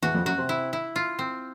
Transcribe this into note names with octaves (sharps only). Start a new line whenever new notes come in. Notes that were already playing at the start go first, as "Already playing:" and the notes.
E2 E3 F#4
F2 F3
F#2 F#3 F#4
C3 C4
E4
E4
F4
C4